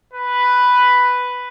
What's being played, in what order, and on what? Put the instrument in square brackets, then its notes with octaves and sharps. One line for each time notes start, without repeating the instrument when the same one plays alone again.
[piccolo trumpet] B4